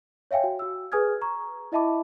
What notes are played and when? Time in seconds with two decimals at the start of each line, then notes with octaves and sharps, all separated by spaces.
0.31 C#5 E5 F5 G5 G#5
0.44 F#4
0.59 F#4 E6
0.92 G#4 B4 G#5 D#6 F6 G#6
1.21 A#5 C#6
1.72 E4 D#5 E5 A5 B5 D6